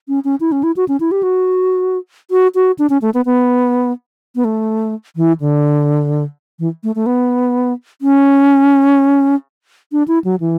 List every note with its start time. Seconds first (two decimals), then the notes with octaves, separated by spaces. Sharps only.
0.08 C#4
0.24 C#4
0.40 E4
0.52 C#4
0.63 E4
0.76 F#4
0.88 C#4
1.00 E4
1.11 G4
1.23 F#4
2.31 F#4
2.55 F#4
2.79 D4
2.90 C#4
3.02 A3
3.14 B3
3.25 B3
4.36 B3
4.45 A3
5.16 E3
5.40 D3
6.59 E3
6.84 A3
6.95 A3
7.06 B3
8.02 C#4
9.92 D4
10.08 E4
10.24 F#3
10.40 E3